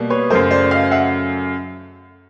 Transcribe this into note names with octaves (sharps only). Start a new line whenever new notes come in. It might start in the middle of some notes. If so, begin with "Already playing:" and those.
Already playing: B2 G3 A#3
B4 C#5
F#2 C#3 F#3 A3 A#4 C5
C5 D5
D#5 F5
E5 F#5